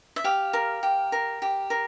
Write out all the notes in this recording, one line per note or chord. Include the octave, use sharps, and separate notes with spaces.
E5
G4 F5
A#4
G4
A#4
G4
A#4